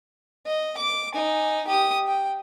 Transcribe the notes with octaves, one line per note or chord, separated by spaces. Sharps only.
D#5
D6
D#4 G#5
G4 D#6
G5